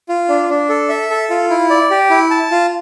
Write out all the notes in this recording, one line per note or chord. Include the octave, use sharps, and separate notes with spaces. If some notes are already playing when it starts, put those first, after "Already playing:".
F4
D4
D4
A4
E5
A4
F4
E4
D5
G4
E4
A5
F4